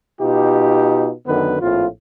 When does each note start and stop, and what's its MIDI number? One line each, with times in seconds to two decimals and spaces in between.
0.19 1.09 47
0.19 1.09 63
0.19 1.09 65
0.19 1.09 67
1.27 1.58 42
1.27 1.58 50
1.27 1.58 51
1.27 1.58 59
1.27 1.58 71
1.60 1.86 34
1.60 1.86 45
1.60 1.86 60
1.60 1.86 65